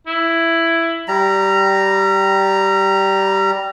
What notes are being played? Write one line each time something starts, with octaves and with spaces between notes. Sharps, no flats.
E4
G3 A#5